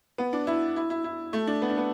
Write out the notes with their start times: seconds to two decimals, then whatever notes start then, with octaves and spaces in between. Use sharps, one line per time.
0.18 B3
0.33 D4
0.47 E4
0.76 E4
0.90 E4
1.04 E4
1.33 A3
1.47 D4
1.62 B3
1.70 D4
1.77 B3